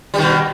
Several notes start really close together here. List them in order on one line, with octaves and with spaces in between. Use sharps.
G3 D#3 B2